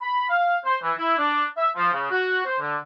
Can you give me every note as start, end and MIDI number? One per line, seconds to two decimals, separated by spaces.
0.02 0.26 83
0.29 0.58 77
0.65 0.76 72
0.83 0.92 52
0.97 1.17 64
1.18 1.44 62
1.57 1.70 76
1.76 1.89 53
1.93 2.07 49
2.11 2.45 66
2.45 2.59 72
2.60 2.76 50